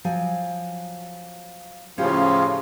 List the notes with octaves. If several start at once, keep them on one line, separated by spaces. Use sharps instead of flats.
F3 F#3 G#5
A2 C#3 F3 C#4 F4 G4